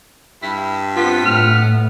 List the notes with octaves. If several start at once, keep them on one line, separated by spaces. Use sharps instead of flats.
G2 E4
B3 C4 F4 B6
A2 F6